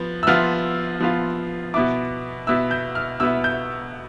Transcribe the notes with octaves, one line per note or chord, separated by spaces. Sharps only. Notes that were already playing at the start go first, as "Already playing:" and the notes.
Already playing: F3 B3
E6
F3 B3 F4 F6
F3 B3 F4
B2 B3 E4 D6
B2 B3 E4 E6
G6
F6
B2 B3 E4 E6
G6